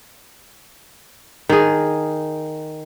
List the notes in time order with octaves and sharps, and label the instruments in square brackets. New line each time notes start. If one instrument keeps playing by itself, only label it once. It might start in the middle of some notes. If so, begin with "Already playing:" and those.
[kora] D#3 G#4